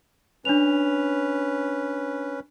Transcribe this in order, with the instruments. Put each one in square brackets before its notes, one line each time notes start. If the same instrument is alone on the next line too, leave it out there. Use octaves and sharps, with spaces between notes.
[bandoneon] C#4 B4 [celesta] D4 F7